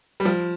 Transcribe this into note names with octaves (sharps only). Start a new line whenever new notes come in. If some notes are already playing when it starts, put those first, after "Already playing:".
G3
F3